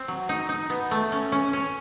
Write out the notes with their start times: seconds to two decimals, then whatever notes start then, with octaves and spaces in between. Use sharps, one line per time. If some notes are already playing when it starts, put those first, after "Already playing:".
Already playing: C4
0.08 F#3
0.29 D#4
0.49 D#4
0.70 B3
0.91 A3
1.12 C#4
1.32 C#4
1.53 C#4